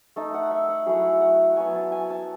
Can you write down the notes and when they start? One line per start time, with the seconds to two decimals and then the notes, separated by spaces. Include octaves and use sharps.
0.16 A3 D#4 A5
0.34 F#5
0.51 E5
0.69 F#5
0.86 F#3 A3 E4 G#4
1.21 F#5
1.56 F#3 B3 E4 G#5
1.74 A5
1.92 G#5
2.10 A5